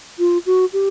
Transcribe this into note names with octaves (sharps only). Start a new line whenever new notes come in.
F4
F#4
G4